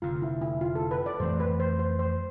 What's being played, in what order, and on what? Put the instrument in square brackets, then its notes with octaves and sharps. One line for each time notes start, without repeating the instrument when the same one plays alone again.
[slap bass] F1 F2 D3 [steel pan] F4
[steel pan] E4
E4
F4
A4
B4
D5
[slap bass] F2 E3 A3 C4 [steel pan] C5
[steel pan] B4
C5
C5
C5